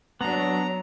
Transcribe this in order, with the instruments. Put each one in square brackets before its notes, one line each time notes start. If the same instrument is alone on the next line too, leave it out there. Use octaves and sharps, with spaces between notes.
[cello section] F#3 [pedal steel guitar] B3 D4 [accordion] A#5